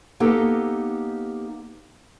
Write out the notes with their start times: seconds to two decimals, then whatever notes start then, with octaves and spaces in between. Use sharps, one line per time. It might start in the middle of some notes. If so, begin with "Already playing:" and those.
0.20 A#3 B3 D#4 G4 A4